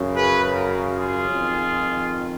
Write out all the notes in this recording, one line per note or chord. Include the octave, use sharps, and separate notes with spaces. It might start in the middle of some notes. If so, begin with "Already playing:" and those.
Already playing: F#2 C#3
G#4 B4
F#4 A#4
F4 G#4
F2 D#3